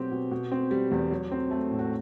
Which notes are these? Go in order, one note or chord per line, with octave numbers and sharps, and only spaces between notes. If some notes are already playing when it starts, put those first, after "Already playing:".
Already playing: B2 F#3 C4 G4
B2
B2
C4
G3
E2
F#3
C4
A3
A2
F#4